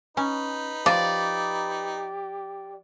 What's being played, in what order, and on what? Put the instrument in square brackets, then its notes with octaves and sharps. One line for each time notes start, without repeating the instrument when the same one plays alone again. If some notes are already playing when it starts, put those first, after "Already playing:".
[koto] C#4 [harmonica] D#4 B4
[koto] F3 [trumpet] G4 [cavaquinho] D5